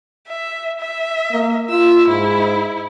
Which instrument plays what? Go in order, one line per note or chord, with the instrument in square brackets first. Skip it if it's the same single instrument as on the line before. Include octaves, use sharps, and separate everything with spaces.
[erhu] E5
E5
[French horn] A#3
[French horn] F4 [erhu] E6
[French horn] G#2 [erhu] E4